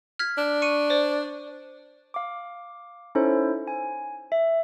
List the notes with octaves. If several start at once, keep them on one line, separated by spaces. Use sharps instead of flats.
F6 G#6 B6
D4
C#6 C#7 D#7
C5 D5
F5 D6
C#4 D#4 E4 A4 C5 C#5
G#5
E5